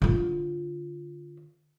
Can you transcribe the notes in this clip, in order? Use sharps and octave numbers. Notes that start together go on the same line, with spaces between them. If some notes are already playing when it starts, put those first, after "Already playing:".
D3 F4